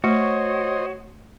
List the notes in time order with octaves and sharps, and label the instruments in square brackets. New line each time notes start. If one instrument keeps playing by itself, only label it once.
[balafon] A3 [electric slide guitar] F#4 [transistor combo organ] C5 D#5 [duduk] C#5